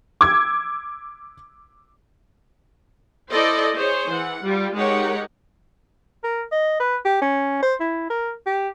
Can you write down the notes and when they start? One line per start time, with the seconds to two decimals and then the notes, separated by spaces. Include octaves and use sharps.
0.21 D6 E6 G#6
3.31 E4 A4 C5 D5 D#5
3.75 G#4 C5 C#5
4.10 E3 F#5
4.44 G3 F4
4.75 G#3 D#4 G4 A#4 C#5 F#5
6.24 A#4
6.52 D#5
6.80 B4
7.05 G4
7.22 C#4
7.62 C5
7.80 E4
8.10 A#4
8.46 G4